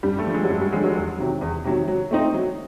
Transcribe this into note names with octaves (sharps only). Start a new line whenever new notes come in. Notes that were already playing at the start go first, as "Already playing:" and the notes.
G2 G3
A3
D3 F3
G#3
F#3
G2 G3
G3
D3 F3 G#3
F#3
E2
C3 D#3 F#3
E2
C3 D#3 F#3
F#3
A3 C4 D#4
F#3